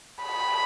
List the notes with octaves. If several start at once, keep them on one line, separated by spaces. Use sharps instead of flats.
B5